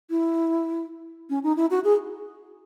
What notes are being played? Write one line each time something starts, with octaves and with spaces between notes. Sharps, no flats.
E4
C#4
D#4
E4
F#4
G#4